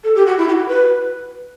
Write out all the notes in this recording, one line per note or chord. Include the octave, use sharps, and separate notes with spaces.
A4
G4
F#4
E4
G4
F#4
B4